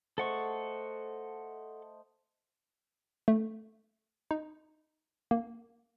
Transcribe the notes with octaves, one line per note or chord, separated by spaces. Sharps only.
A3 A4 C5 D#5 F#5 C#6
A3
D#4
A#3